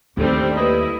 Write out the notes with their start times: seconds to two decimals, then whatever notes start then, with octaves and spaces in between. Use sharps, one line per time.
0.17 D#2 G3 A3 C4 D4 D#4
0.56 A#3 E4 G4 B4 D#5